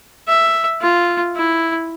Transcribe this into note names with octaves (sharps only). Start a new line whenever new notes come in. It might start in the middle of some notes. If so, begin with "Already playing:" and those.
E5
F4
E4